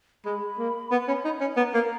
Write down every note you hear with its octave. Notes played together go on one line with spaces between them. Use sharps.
G#3 B5
A#3
B3
C#4
D#4
C#4
B3 A#5
A#3